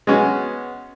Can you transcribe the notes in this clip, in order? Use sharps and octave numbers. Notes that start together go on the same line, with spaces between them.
G#3 B3 C#4 F#4